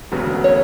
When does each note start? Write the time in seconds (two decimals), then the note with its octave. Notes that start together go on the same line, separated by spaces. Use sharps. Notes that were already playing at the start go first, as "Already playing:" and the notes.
0.12 E1 D2 C#3 F#3 B3
0.44 C#5